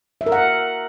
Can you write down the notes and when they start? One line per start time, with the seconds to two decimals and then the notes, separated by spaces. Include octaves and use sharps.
0.21 E5
0.26 A#4
0.32 F#5